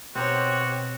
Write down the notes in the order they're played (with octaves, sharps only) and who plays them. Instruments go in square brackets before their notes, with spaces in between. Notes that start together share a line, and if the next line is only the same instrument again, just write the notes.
[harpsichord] B2 D#4 [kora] C4 [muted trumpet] F#4 [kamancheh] G4 C#5